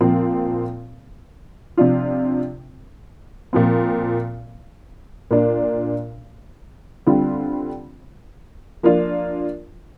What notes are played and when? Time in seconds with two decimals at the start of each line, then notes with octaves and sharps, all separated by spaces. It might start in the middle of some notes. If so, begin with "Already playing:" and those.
0.01 A#2 F3 C4
1.77 C3 F3 D4 F4
3.53 A#2 F3 C4
5.31 A#2 A#3 D4
7.07 D3 G3 C4 F4
8.83 F3 A#3 D4 F4